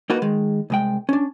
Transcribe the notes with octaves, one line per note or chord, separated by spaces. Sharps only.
A#3 D#4 F#4 B4
D#3 G#3
C2 G#3 G5
C#4 D4